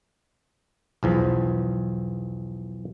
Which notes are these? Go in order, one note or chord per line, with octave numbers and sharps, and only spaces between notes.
B1 E2 F3